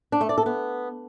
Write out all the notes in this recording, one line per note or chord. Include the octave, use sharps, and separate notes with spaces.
D4
A3
D5
A4
B3